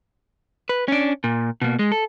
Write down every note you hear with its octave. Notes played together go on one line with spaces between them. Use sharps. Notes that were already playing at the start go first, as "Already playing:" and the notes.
B4
C#4 D4
A#2
B2 A#3
G#3
A4